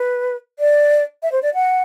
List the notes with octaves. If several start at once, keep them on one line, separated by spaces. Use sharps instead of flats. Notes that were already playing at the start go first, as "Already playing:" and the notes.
Already playing: B4
D5
E5
C5
D5
F#5